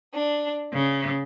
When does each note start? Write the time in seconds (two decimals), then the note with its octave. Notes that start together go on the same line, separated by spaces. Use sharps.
0.15 D4
0.73 C#3